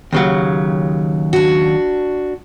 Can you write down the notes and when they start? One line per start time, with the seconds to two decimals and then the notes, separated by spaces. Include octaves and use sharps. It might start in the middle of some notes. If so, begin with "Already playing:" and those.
0.13 D#2 C#3 F#3
1.33 D4 F#4